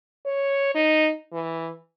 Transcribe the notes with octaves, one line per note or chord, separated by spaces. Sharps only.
C#5
D#4
E3